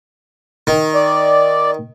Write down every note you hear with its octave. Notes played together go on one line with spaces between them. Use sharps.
D#3
D5